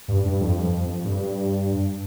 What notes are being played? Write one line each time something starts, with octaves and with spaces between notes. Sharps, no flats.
G2
G2
F2
G2